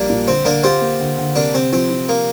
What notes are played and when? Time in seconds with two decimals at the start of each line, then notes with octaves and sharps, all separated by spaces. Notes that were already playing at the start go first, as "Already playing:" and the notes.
Already playing: A#1 G3 A#3 D4
0.10 A#2
0.28 D3 C4
0.45 D3 A#3 D4
0.63 C4 F4 G4
0.82 A#3
1.00 D3
1.18 D3
1.36 C3 A#3 D4
1.54 C3 C4
1.72 F3 C4
1.91 F3
2.09 A#3